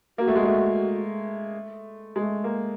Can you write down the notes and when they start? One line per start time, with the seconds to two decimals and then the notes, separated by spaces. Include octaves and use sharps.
0.18 A#3 F#4
0.28 A3
0.35 G#3
0.44 A3
2.16 G#3
2.22 A3
2.44 A#3